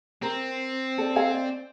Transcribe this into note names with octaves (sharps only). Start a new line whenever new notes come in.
C4 A#4
A4 D5
A4 F5 G#5
D5